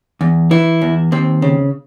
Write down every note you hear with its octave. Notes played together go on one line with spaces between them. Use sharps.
E2
E3 E4
E2
D#2 C4
C#3